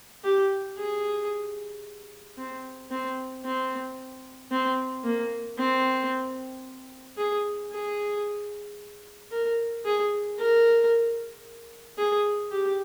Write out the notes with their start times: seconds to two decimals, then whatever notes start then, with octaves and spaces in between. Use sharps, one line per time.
0.24 G4
0.78 G#4
2.38 C4
2.91 C4
3.45 C4
4.51 C4
5.05 A#3
5.58 C4
7.18 G#4
7.71 G#4
9.32 A#4
9.85 G#4
10.38 A#4
11.98 G#4
12.51 G4